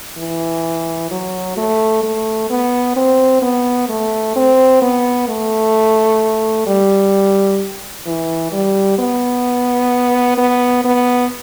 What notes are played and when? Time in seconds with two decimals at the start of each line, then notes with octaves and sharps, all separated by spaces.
0.17 E3
1.11 F#3
1.57 A3
2.03 A3
2.50 B3
2.96 C4
3.42 B3
3.89 A3
4.35 C4
4.82 B3
5.28 A3
6.67 G3
8.06 E3
8.52 G3
8.99 B3
10.37 B3
10.84 B3